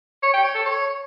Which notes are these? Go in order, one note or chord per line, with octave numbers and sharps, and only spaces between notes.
C#5
G5
C#5
A4
C#5